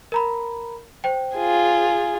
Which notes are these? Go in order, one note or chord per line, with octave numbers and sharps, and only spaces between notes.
A#4 A#5 B5
C5 G5
F4 G#4